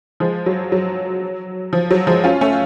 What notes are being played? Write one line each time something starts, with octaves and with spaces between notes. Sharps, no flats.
F3 G#3
F#3
F#3
F3
F#3
F3 G#3
C#4 F4
A3 C#4